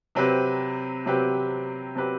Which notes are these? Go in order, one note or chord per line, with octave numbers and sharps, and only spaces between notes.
C3 F#3 C4 G4 B4
C3 F#3 C4 G4 B4
C3 F#3 C4 G4 B4